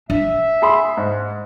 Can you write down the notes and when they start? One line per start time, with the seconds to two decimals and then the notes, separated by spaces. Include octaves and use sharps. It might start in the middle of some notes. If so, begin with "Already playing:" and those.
0.10 D4 E5
0.62 G#4 B5 C6
0.97 G#2